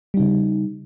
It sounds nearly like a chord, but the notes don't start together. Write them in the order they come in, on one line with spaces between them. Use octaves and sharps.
G3 D#4 C#3